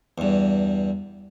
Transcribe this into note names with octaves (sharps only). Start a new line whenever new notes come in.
E2 G2